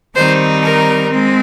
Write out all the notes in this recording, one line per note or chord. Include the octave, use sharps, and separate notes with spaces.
D#3 G3 C4 D#4 C5
A#4
G#3 C4